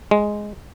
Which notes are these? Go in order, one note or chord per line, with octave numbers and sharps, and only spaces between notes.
G#3